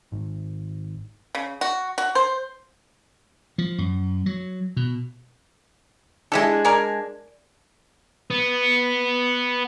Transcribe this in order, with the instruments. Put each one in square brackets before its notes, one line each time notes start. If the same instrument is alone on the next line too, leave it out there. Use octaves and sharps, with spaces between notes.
[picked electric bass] G#1
[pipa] C#3
F#4
F#4
C5
[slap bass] F3
F#2
F#3
B2
[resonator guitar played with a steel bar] G#3 D4 [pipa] E4 G4 A4
[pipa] A#4 D5 G#5
[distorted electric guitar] B3